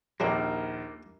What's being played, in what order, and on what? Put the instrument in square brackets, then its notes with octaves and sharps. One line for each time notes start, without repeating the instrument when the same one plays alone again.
[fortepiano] A#1 D#2 [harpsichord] C#3 F3 D4 [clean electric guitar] A#3 [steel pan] G4 A#4